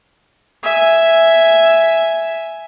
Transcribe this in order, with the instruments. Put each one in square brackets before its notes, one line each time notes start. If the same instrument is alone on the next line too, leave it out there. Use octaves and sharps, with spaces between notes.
[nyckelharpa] E5 G#5